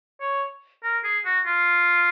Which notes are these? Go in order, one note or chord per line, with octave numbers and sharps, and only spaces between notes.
C#5
A#4
G#4
F#4
F4